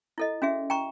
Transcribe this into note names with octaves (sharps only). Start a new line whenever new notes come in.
E4 A4 D#5
C#4 F#4 G#4 E5
G5 A#5 C#6